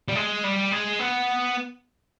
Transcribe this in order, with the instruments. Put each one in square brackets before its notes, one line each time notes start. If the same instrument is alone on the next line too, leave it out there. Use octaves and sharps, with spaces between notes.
[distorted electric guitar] G3
G#3
G3
G#3
B3